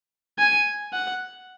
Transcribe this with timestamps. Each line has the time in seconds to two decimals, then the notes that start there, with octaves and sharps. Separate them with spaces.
0.39 G#5
0.93 F#5